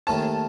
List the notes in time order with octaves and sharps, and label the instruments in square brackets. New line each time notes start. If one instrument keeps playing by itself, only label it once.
[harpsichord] D#2 D#3 A3 C#4 [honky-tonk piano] A5